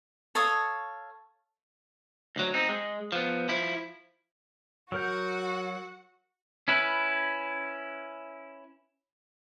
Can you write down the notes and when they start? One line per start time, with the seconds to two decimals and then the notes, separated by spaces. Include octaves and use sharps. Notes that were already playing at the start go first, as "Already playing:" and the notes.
0.35 A4 C#5 F5 D#6
2.36 D2 F#3
2.54 C4 D#4
2.69 G#3
3.12 F3 B3
3.49 F3 E4
4.92 F#3 F#4 A#4 F#5 G6
6.68 C#4 E4 B4